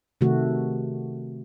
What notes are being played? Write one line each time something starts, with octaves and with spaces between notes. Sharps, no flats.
C3 D#3 A3 F#4